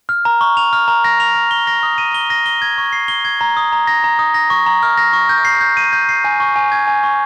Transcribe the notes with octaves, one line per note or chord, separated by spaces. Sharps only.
F6
A#5
C#6
F7
F6
A#5
A#6
F7
F6
G7
A#6
D#6
D#7
G7
A#6
G7
G#6
C#6
C7
G7
G#6
A#5
D#6
A#5
A#6
A#5
D#6
A#6
C#6
A#5
F6
A#6
C#6
G6
C7
G6
D#7
G6
C7
G#5
C#6
G#5
G#6
G#5
C#6